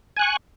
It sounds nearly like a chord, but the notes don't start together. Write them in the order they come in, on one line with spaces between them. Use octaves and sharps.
G#5 F#6 C#6